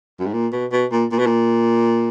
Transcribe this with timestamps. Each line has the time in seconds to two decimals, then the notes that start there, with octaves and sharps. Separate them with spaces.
0.19 F#2
0.26 G#2
0.33 A#2
0.52 B2
0.72 B2
0.92 A#2
1.11 A#2
1.19 B2
1.26 A#2